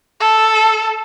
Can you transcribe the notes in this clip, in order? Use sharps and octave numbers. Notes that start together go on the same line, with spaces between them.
A4